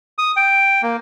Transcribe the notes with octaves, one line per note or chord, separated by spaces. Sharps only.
D#6
G5
A#3